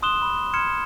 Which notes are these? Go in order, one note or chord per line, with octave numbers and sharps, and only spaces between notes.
C6 D#6 F#6 E7 G7
B5
C6 F6 G#6 C#7 E7